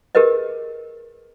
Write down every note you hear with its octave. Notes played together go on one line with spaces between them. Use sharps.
G4 G#4 A#4 B4 D#5